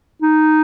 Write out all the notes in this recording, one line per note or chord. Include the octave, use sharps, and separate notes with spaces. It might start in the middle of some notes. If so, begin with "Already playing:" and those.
D#4